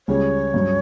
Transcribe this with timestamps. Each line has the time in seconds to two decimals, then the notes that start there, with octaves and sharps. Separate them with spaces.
0.08 C#2 C#3 G3 C#4 C#5
0.54 G2 F#3 C#4